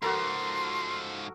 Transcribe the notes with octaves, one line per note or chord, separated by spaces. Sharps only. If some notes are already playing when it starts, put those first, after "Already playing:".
G#2 F3 F#4 A4 A#4 C6